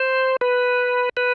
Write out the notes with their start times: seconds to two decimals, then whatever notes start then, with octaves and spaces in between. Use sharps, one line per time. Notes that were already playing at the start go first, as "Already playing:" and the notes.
Already playing: C5
0.41 B4
1.17 B4